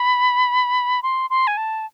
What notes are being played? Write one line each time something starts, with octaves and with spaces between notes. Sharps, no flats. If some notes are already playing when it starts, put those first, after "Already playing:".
Already playing: B5
C6
C6
G#5
A5